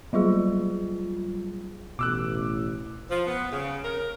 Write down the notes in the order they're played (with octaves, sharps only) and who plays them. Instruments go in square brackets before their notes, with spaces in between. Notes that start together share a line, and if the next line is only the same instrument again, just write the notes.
[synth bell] F#3 G3 F4 G#4
[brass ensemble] A1 [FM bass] B2 [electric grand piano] D6 E6 F#6
[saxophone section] F3
B3
C#3
A#4